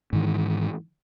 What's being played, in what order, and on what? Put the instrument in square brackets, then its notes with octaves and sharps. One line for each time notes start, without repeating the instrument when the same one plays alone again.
[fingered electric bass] G#2 D#3 E3